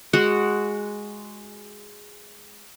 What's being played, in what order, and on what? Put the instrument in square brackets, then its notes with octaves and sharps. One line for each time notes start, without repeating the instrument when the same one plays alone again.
[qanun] G#3 F#4 F#5